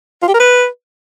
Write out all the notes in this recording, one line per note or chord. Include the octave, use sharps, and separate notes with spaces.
F4
G4
A#4
B4